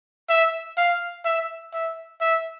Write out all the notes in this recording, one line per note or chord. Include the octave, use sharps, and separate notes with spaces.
E5
F5
E5
E5
E5